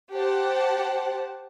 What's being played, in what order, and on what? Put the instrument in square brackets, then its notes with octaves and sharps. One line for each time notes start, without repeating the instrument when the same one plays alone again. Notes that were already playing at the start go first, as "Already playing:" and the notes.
[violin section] G4 C5 F#5 A5